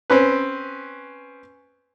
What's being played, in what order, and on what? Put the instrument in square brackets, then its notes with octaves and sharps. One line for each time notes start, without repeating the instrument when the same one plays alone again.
[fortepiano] C4 C#4 B4